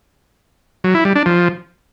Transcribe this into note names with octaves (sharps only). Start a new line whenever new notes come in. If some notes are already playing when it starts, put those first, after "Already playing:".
F#3
E4
G3
D4
F3